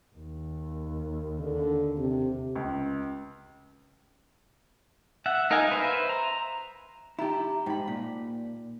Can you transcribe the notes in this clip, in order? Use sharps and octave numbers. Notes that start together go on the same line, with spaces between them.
D#2
D3
C3
C#2
E5 F#5
D#4 A#4 D#5 F5 G#5
B4 C5 E5
A#5
D#4 E4 G4 A#5 B5
G#2 D#4 G5 B5
A#2 F5